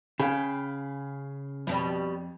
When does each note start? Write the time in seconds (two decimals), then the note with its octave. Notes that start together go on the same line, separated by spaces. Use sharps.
0.19 C#3 G#4 F5 G5 G#5 B5
1.67 F2 B2 E3 G3